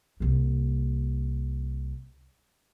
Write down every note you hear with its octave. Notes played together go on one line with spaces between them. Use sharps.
C2 A#3